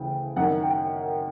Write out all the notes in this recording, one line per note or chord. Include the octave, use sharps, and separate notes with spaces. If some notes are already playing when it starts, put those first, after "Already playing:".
Already playing: D2 C#3 E3 G5
F#2 D#3 F#5
G5